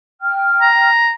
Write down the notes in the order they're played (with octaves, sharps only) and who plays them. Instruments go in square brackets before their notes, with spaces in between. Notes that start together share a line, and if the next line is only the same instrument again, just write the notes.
[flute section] G5 F6
[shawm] A#5